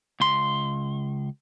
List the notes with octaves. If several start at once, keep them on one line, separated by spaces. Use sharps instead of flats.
C#2 C6